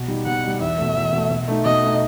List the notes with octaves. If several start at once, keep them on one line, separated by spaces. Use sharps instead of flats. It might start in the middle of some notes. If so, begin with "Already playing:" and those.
Already playing: B2
G3 D#4
B2 F#5
G3 D#4
E2 E5
B2 A3
E2
B2 A3
B2
A3 D#4
B2 D#5
A3 D#4